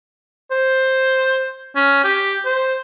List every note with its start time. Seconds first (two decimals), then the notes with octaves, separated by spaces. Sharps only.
0.51 C5
1.76 C#4
2.04 G4
2.45 C5